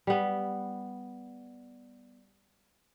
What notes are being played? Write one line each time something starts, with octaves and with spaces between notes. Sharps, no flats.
G3 B3